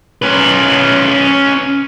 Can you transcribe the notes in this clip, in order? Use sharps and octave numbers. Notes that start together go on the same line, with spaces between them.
C#4 B4